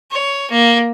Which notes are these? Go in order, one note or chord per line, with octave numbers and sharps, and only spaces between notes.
C#5
A#3